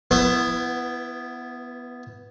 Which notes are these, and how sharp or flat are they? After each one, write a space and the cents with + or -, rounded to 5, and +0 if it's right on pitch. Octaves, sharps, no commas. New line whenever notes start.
B3 +0 E4 +20 B4 +45